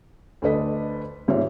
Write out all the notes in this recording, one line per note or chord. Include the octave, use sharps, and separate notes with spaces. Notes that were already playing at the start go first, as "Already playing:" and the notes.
D2 D4 A4 B4 D#5 B6
G#1 G#2 F4 G4 C#5 E5